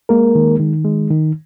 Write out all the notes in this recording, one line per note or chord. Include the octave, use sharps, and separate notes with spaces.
G#3 A#3 A#4
D#3
D#3
G#3
D#3